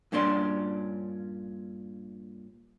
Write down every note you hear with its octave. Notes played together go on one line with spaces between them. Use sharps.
G2 A#2 C#4 D4 C6